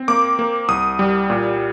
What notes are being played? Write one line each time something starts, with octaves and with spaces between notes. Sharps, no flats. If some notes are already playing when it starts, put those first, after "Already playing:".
Already playing: C4
A#3 D6
A#3
C2 D#6
G3
A#2